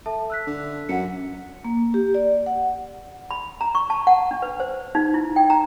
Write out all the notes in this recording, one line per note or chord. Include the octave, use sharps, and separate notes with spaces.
A4 E5 A5
E6 F#6 B6
D3
F#2 F#5 C#7
A#3
G4
D5
F#5
B5
A#5
C#6
A5
F#5
D4
B4
C5
D#4
E4
G5
A#5